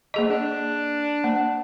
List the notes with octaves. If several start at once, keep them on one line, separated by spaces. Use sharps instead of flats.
A#3 G#4 D#5
D4
A#3